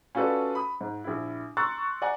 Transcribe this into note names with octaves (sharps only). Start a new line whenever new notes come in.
C#4 F4 F#4 A4 B4 D5
B5 D#6
G#2
A#1 E4
A#5 C6 C#6 E6 F#6 A6
D5 F#5 G#5 A#5